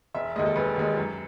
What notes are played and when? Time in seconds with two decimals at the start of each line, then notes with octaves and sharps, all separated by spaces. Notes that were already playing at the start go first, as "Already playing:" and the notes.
0.14 E1 E5
0.36 D#2 D#3 G#3 D#5
0.45 A4
0.56 E1 B4
0.76 D#2 D#3 G#3
0.97 F#2